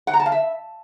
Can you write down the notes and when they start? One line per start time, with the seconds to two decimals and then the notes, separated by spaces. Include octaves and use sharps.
0.07 F#5
0.13 A#5
0.20 A5
0.26 F5
0.32 E5